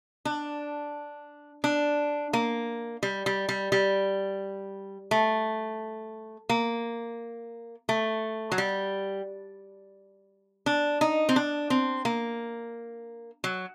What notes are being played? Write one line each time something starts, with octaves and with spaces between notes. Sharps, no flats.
D4
D4
A#3
G3
G3
G3
G3
A3
A#3
A3
F#3
G3
D4
D#4
C4
D4
C4
A#3
F#3